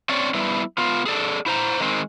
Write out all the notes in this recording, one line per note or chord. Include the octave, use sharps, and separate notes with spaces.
C4 C#4 C#5 D5
G3 B3 E4
B3 F4
G#4 A4 D5
E4 C5 A#5
D#3 G#3 C4